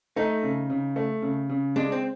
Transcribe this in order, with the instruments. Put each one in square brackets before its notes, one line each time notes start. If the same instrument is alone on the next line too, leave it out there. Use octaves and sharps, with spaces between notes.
[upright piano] A3 [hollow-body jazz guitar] D#4
[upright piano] C#3
C#3
A3
C#3
C#3
[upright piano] G#3 [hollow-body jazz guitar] D4
[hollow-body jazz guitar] C4